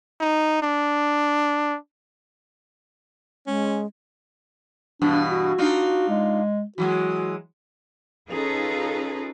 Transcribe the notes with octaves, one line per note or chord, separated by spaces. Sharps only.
D#4
D4
G#3 C#4
G2 B2 E3 D4
F#4
D4 D#4 F4
G#3
E3 F#3 G#3 F#4
C#4 D#4 F4 G#4 A4 B4